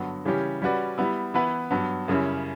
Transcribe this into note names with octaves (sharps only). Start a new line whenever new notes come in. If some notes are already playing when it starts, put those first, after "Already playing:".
Already playing: G2 D3 F#3 B3 F#4
C#3 E3 G3 C#4 G4
G3 C#4 F#4 B4 D5
G3 B3 E4
E3 B3 E4 B4
G2 F#3 B3
F#2 C#3 G3 C#4 E4